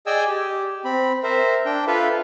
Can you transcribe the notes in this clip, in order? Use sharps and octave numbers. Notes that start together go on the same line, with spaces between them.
G#4 D5 D#5 G5 G#5 E6
G4
C4 B5
A#4 C5 E5
D4 G5
F4 A4 B4 E5 F5